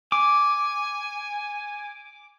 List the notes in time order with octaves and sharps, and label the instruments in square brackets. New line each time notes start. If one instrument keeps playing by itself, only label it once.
[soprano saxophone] G#5 [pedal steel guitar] D6